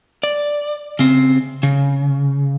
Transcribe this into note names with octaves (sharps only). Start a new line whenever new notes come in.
D5
C#3 C4
C#3